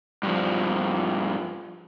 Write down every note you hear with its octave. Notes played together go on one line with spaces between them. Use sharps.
G2 F3